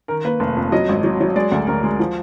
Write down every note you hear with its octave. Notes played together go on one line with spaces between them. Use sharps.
D#3 A#4
A#3 B4
F1
F2
F#3 D#5
G#1
F#3
F#3
G#3 D5
D2
D2 A#4
G#3
F3